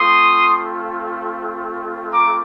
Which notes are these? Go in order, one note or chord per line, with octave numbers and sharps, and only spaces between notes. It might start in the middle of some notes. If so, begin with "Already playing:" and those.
Already playing: A3 C4 F4 C6 D#6
A#5 D6